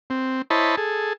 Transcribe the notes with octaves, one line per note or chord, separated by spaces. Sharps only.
C4
E4 C5 C#5 D#5 A5 B5
G#4 A4